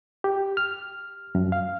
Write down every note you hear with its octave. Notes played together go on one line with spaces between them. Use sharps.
G4
F6
F#2
F5